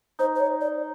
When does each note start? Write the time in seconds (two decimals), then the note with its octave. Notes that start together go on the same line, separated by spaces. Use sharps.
0.19 D#4 C5
0.35 C5
0.40 C#5
0.61 D5